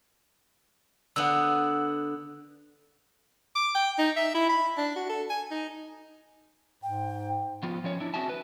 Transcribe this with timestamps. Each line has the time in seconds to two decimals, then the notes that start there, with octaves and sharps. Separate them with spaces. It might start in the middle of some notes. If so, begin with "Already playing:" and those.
1.16 D3 B3 F#5 E6
3.56 D6
3.75 G5
3.99 D#4
4.17 E5
4.34 E4
4.49 B5
4.78 D4
4.96 F#4
5.09 A4
5.30 G#5
5.51 D#4
6.83 G#2 G5
7.63 F3 B3 F4
7.84 F3 C#4 C#5
8.00 D4 E4
8.14 C4 F#4 G#4 E5 A5
8.29 B4